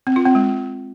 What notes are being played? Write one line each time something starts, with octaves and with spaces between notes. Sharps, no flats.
C4
F4
C4
G#3